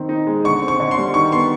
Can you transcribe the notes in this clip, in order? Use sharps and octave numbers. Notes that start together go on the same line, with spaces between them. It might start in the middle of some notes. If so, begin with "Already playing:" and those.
Already playing: D#3 C4
D#4
G#3
D3 C#6
C4
C#6
D3
C6
G3
D#3 C#6
B3 C6